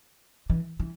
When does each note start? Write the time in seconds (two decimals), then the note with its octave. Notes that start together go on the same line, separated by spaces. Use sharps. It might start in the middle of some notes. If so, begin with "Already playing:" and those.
0.50 E3
0.80 E3